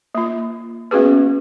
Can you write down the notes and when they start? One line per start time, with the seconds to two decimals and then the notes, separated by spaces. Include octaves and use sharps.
0.15 A#3 F4
0.91 A#3 B3 C#4 F#4 G#4 B4